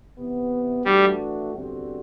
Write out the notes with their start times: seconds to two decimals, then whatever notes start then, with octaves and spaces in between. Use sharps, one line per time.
0.17 C3 E3 B3
0.85 E3 G3 A3 D4 F#4
1.53 E2 D3 G3 C4 F#4